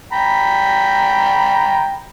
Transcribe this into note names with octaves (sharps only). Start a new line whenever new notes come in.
G5 A#5 B5